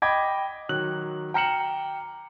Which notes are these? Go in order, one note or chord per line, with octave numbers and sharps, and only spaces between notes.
D#5 G5 B5 D6 G#6
D#3 F#3 F#6 F#7
G5 A#5 F6 C#7 E7 F#7